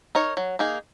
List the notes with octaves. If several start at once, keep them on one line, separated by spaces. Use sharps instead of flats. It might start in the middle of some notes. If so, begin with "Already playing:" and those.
D#4 A#4 C#5
F#3
A#3 D#4 G#4